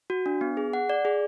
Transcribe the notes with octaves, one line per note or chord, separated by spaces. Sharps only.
F#4
D4
B3
G#4
F#5
D5
G#4